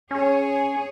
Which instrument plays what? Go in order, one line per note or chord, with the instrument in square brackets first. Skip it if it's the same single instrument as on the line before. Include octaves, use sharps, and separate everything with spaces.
[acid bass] C#4 [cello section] G#4 C#5 [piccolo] G#5